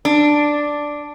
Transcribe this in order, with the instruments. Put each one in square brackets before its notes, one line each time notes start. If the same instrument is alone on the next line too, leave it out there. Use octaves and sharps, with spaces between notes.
[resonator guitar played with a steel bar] D4